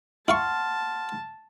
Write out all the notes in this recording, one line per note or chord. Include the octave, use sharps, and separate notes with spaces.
E4 F5 F#5 A5 C6 C#6 F6